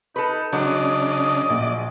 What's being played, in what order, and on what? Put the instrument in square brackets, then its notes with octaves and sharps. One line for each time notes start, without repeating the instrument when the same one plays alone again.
[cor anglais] D#4 [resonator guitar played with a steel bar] A4 B4
[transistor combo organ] C#3 D4 [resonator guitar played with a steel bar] F#3 G#3 [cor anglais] D#5
[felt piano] A#1 [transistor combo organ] D5